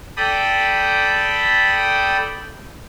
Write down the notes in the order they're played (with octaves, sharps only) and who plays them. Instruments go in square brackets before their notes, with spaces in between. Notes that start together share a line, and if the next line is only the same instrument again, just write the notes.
[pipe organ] A4 D5 G5 B5 D#6